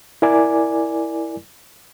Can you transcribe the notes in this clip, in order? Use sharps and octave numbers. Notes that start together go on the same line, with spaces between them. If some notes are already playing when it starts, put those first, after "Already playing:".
E4 A#4 D5 G#5 D6